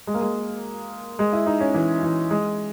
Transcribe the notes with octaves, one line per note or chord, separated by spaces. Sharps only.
G#3
A#3
G#3
G#3
E4
D#4
C#4
E3
E3
G#3